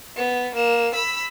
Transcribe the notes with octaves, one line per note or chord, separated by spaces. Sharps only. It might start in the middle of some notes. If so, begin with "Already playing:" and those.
B3
A#3 E7
B5 E6